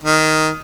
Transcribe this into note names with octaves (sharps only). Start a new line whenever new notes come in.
D#3